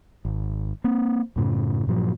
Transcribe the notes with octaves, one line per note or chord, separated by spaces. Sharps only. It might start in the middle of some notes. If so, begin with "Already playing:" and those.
G#1
A#3 C4
F#2 A2 C#3
G2 A#2 F3 F#3